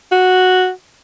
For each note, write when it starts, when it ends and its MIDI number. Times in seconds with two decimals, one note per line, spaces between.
0.12 0.70 66